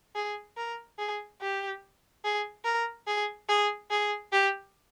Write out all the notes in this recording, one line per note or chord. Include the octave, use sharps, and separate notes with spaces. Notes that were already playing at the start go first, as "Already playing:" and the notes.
G#4
A#4
G#4
G4
G#4
A#4
G#4
G#4
G#4
G4